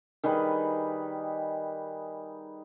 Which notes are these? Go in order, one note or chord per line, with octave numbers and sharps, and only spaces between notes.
D#3 G3 G#4 B4